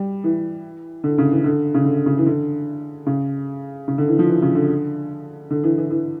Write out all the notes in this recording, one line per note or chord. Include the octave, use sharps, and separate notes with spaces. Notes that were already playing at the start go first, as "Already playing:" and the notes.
Already playing: G3
E3
D3
C#3
E3
D3
C#3
D3
C#3
E3
D3
C#3
C#3
D3
E3
F3
E3
C#3
D3
D3
E3
E3
E3